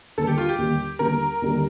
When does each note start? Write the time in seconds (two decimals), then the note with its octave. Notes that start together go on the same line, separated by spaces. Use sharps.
0.18 D#2 D3 G3 A4
0.27 G4
0.38 F4
0.49 G4
0.58 D#2 D3 G3
0.99 D#2 D3 G3 A#4
1.42 D#2 D3 G3